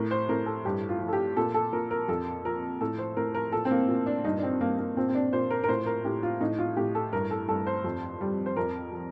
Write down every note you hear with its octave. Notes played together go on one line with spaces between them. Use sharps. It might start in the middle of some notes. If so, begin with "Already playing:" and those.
Already playing: A2 A#4
C5
A2 A#4
A4
G2 G4
F4
F3
A4
G4
A#2 A4
A4
A#2 A#4
A#4
F2 A4
F3 A#4
A2 A4
C5
A2 A#4
A#4
A#2 A4
C4
A#3
A#2
D4
G2 D#4
D4
C4
G2 A#3
A#3
A#2 C4
C4
D4
A#2 C5
A#4
A#4
A2 C5
A#4
A2 G4
F4
A2 D#4
F4
A2 G4
A4
G2 A#4
A4
G2 A4
C5
F2
G3
C5
F2 A#4
F3